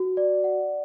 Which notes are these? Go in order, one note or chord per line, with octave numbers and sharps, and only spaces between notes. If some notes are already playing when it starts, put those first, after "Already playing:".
Already playing: F#4
D5
F#5